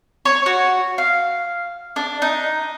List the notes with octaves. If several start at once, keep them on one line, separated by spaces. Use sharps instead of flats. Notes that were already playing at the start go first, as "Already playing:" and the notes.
C#5
F#4
F5
D4
D#4